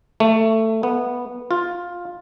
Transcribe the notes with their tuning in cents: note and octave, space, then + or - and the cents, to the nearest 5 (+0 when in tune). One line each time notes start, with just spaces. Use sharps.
A3 +15
B3 -10
F4 +10